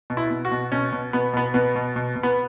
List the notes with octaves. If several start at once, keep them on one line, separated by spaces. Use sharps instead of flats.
B2
E4
B2
F#4
B2
B2 C#4
B2
B2 B3
B2 B3
B2 B3
B2
B2
B2
B3